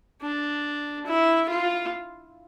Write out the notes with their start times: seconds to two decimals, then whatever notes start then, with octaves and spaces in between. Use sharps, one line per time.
0.22 D4
1.06 E4
1.49 F4